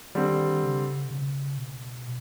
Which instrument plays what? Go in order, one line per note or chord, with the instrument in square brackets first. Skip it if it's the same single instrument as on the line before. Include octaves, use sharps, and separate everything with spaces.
[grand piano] D3 G3 C4 [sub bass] D#3
[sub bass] C#3
C3
C#3
B2